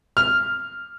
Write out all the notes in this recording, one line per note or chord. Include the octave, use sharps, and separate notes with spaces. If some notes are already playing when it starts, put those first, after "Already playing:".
F6